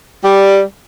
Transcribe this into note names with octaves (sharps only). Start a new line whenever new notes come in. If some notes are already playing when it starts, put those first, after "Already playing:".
G3